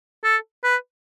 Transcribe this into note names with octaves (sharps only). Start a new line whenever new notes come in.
A4
B4